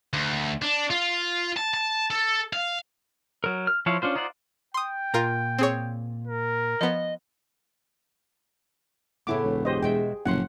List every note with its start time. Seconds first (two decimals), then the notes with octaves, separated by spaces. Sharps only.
0.13 D2
0.62 D4
0.90 F4
1.56 A5
1.74 A5
2.10 A4
2.53 F5
3.44 F#3 A#4
3.67 F6
3.86 F3 E4 C5 C#5 F5
4.02 C#4 D4 F4 C5
4.16 D#4 F4 C5 D5 F#5
4.74 G5 C6 D#6
5.14 A#2 F4 A#4 A#5
5.59 C4 G#4 C#5
6.27 A#4
6.81 F3 B3 D#5
9.27 A2 C#3 B3 E4 A4 D6
9.44 E1
9.65 G4 G#4 C5 D#5
9.82 B2 G#3 E5 G5
10.26 F#1 A2 C3 F3 F#5 C6